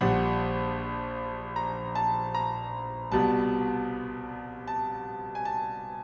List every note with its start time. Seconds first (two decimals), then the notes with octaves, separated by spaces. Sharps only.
0.01 A#1 A#2 G3 F#5
1.56 A#5
1.95 A5
2.35 A#5
3.12 C2 B2 G3 A5
4.67 A5
5.35 G#5
5.45 A5